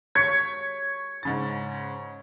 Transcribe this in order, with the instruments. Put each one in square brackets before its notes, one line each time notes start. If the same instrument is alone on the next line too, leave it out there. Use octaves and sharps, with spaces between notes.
[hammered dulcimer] C#5 [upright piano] G#6 B6 C#7
[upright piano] G#2 C#3 A6